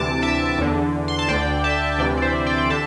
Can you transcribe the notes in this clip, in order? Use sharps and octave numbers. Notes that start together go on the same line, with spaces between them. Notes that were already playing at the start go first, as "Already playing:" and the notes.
Already playing: D2 C3 E3 A5 D6
E5 A5
E2 D3
C6
A5
D2 D3 D5 G5
E5 A5
D2 C3 E3 D5 G5
D5
C5 E5
D5 G5
G5
D3 E5 A5